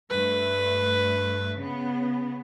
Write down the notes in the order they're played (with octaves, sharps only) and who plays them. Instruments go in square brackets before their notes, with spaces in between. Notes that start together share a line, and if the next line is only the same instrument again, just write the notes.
[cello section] G2 A3 [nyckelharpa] B4
[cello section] C#3 B3